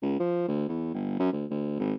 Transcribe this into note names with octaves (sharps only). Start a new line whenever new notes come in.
C#2
F3
D2
E2
G1
F#2
D2
D2
G#1